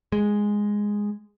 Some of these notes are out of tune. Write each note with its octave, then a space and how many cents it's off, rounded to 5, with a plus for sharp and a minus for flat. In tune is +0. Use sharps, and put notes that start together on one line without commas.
G#3 -5